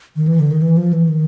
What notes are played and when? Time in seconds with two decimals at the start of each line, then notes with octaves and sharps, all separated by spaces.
0.16 D#3
0.28 E3
0.39 D3
0.51 D#3
0.62 E3
0.77 F3
0.93 E3
1.09 D#3